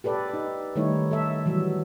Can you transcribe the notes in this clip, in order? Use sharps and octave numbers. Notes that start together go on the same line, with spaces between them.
G4 A4 B4 D5
D#4
D#3 G3 A3 D#4 E4 C#5
A4 E5
E3 F#3 G3